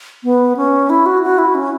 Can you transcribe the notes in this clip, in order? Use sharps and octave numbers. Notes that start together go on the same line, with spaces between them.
B3
C#4
E4
F#4
F#4
E4
C#4